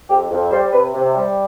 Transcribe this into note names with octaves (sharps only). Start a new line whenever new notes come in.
F2 G4
F2
G3 C5
C3 B4
C3
G3